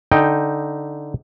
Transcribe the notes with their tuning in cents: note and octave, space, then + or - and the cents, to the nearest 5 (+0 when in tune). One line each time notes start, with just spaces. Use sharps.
D3 -5 D#4 +0 G5 +0